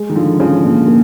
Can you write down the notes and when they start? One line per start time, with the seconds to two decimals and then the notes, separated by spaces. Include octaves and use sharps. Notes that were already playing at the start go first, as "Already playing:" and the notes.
Already playing: G#3
0.10 D#3
0.15 D3 F3
0.40 C#3 F3
0.64 A#2
0.87 A#3